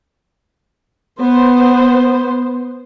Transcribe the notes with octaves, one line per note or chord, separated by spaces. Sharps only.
B3 C5